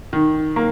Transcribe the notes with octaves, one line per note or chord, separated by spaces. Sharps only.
D#3
A#3